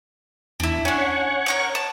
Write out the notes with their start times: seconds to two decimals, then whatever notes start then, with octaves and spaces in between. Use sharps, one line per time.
0.60 E2 D4 E4
0.85 C#4 D4 C#5 F#5
1.46 A#4 C#6 G6
1.75 A5